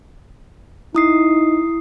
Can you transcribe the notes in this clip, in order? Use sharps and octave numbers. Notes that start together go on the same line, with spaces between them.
D#4 E4 D#6 C7